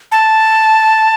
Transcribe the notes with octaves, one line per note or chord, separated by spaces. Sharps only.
A5